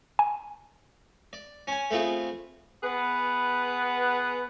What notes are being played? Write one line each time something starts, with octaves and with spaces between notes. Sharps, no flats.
G#5
D5
C#4 G#5
A3 B3 C4 F4 G#4
B3 G#4 B4 F#5